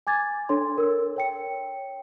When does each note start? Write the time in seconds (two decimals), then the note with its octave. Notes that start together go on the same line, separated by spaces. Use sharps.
0.07 G#5 D6 G#6 A6
0.49 D4 A4 C#5 C6
0.78 A#4 E6
1.16 C#5 G5 C#7